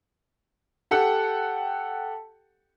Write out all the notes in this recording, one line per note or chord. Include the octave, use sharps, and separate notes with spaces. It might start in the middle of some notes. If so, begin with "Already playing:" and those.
G4 A4 F#5 G5